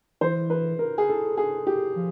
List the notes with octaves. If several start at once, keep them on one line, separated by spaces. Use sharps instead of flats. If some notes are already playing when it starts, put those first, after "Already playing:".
E3 C5
B4
A#4
G#4
A4
G#4
G4
F3